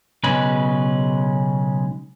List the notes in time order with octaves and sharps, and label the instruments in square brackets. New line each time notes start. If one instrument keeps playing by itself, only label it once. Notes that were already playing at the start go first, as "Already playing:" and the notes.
[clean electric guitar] B1 C#3 G#3 C#4 B4